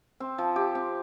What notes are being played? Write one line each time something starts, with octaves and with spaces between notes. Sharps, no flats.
C4
F3
G4
C4